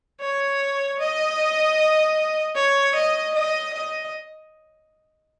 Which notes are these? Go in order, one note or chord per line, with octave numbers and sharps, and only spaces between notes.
C#5
D#5
C#5
D#5
D#5
D#5